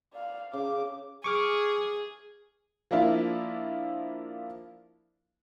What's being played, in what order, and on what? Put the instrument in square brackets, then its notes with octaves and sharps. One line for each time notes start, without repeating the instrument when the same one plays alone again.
[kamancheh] D5 F5
[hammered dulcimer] C#3 [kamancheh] D6
[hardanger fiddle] G#4 [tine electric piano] C#6 D6 F6
[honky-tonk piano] F3 A#3 D4 E4 F4